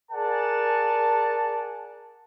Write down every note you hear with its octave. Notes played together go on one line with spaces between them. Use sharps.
G#4 A#4 D5 F#5 G#5 A5